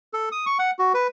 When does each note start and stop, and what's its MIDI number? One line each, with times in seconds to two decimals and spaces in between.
0.13 0.29 69
0.32 0.45 87
0.46 0.58 85
0.59 0.71 78
0.79 0.93 66
0.94 1.07 71